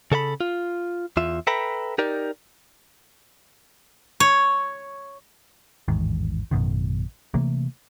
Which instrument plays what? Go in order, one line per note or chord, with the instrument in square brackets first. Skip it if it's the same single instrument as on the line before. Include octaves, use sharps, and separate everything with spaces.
[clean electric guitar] C#3 A4 E5 B5
F4
E2 F4 E5
A4 B4 E5 G5 A#5 B5
D#4 G4 A#4 D5
[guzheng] C#5
[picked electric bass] A1 E2 G#2 D#3
A1 F#2 B2 D#3
C3 E3 A3 A#3